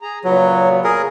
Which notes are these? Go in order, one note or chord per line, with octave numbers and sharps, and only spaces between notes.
G#4 A#5
A#2 C#3 F#3 B3
G#4 A#4